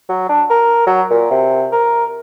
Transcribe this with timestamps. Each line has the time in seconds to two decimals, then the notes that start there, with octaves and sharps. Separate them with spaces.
0.09 F#3
0.29 D4
0.50 A#4
0.87 F#3
1.10 A#2
1.31 C3
1.72 A#4